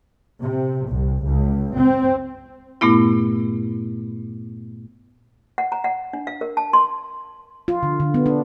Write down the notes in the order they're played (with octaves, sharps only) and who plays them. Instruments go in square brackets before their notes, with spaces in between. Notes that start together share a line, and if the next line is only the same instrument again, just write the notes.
[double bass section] C3
C2
C#2
C4
[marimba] G2 A#2 A3 B3 E4
[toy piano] F#5
A#5
F#5
D4
F5
A#4
A5
C6
[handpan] F4
D3
D3
B3
D4